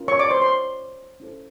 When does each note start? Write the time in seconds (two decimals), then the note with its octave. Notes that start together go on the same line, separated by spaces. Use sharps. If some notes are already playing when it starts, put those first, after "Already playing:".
Already playing: C#4 F4 A#4
0.08 C#5 C#6
0.19 D5 D6
0.30 C5 C6
0.42 C5 C6
1.20 C#4 E4 A4 C5